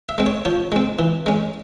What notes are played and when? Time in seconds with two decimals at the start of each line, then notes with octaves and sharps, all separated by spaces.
0.09 E5
0.18 G#3 C4
0.26 C#5
0.45 F3 C#5
0.72 G#3 C4
0.99 E3
1.26 G#3 C#4